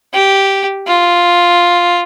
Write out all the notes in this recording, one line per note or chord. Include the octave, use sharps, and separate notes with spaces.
G4
F4